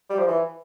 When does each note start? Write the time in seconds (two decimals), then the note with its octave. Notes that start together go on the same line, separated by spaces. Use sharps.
0.10 G3
0.19 F3
0.28 E3